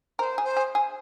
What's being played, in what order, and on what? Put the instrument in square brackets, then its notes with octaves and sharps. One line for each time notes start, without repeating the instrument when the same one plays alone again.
[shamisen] A#4 [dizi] C5
[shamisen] G#4
[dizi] C5
[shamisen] G#4
G#4